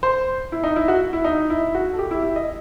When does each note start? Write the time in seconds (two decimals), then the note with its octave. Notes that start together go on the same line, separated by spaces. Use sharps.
0.03 C5
0.52 E4
0.64 D#4
0.76 E4
0.88 F#4
1.13 E4
1.24 D#4
1.50 E4
1.75 F#4
1.93 A4
1.99 G4
2.11 E4
2.22 E4
2.36 D#5